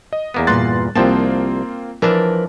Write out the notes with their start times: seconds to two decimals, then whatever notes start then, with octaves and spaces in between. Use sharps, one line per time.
0.13 D#5
0.34 E2 A#3 B3
0.47 G2 A#2 C6 F#6 A6
0.95 C2 F3 A#3 C4 F4 G5 A5
2.02 E3 F3 D4 A#4 B4 A5